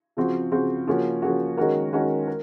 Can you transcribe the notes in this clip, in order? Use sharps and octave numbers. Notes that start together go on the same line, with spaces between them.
C#3 F3 C4 F#4
C#3 F3 C4 F#4
C#3 F3 A#3 C#4 F#4
C#3 F3 A#3 C#4 F#4
D#3 G#3 C#4 F#4 A#4
D#3 G#3 C#4 F#4 A#4
A#4